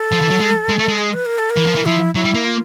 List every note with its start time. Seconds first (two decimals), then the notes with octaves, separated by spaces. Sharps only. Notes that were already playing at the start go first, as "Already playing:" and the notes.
Already playing: A4
0.12 F3
0.21 E3
0.30 F#3
0.40 G#3
0.69 G#3
0.79 A3
0.88 G#3
0.99 G#4
1.13 B4
1.26 A#4
1.38 A4
1.50 A#4
1.57 E3
1.66 F3
1.75 E3
1.86 F3 E4
2.15 F#3 E4
2.25 G3
2.34 A#3
2.44 F4